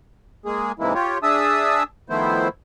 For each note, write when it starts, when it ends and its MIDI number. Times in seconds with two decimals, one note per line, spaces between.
0.45 0.72 56
0.45 0.72 58
0.45 0.72 68
0.79 0.94 44
0.79 0.94 48
0.79 0.94 52
0.79 0.94 56
0.79 0.94 58
0.79 0.94 64
0.94 1.18 65
0.94 1.18 67
0.94 1.18 73
1.23 1.83 62
1.23 1.83 68
1.23 1.83 76
1.23 1.83 81
1.23 1.83 87
1.23 1.83 88
2.10 2.48 51
2.10 2.48 53
2.10 2.48 57
2.10 2.48 59
2.10 2.48 64
2.10 2.48 72